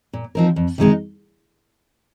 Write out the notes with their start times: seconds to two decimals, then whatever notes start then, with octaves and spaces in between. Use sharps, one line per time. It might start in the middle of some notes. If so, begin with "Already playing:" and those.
0.13 A#2
0.35 F3 C4 D#4 A#4
0.56 F2
0.78 C3 D#3 G#3 D#4